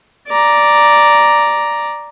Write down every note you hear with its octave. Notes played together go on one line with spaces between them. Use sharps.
D5 A#5